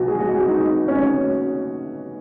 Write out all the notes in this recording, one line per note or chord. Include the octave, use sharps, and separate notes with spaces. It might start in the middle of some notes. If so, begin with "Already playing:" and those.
Already playing: B1 B2 F#3 F#4
G#4
F#4
G#4
F#4
D#4
C#4